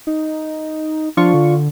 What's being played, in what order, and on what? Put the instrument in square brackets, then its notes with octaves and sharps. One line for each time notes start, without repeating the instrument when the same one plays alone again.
[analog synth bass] D#4
[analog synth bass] F3 [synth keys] D4 F4 C#6
[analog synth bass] D3